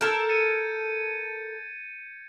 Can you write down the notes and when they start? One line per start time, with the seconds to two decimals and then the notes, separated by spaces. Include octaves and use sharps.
0.01 A4 A#4 G6 G#6
0.29 A6 C#7 D#7